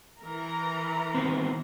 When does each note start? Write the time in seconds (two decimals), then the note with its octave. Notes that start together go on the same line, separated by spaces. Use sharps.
0.23 E3 A#4 A#5
1.15 D#3 B3 C4